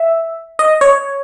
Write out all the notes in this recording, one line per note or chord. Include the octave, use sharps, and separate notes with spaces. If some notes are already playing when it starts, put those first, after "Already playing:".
Already playing: E5
D#5
C#5